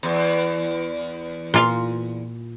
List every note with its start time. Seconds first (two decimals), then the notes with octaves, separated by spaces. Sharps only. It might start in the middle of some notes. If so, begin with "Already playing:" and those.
0.03 E2
1.54 A#2 F4 F5